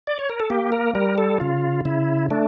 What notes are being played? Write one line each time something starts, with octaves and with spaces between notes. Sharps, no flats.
D5
C#5
A#4
A4
A#3 G4
A#4
G3 A#4
A4
C#3 F4
C#3 E4
A3 D4